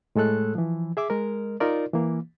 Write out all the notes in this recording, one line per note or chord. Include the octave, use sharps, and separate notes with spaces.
A2 G#3 A3 A4 F#6
E3 F3
G#4 E5 D6
G#3 A#4
D#4 F4 A#4 D5
E3 A#3